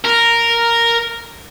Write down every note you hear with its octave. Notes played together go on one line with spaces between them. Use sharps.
A#4